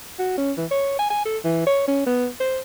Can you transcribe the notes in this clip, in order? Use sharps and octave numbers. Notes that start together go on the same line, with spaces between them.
F#4
C#4
E3
C#5
G#5
G#5
A4
E3
C#5
C#4
B3
C5